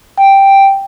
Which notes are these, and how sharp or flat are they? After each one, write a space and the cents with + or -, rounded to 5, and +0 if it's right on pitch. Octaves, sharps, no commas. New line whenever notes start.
G5 +0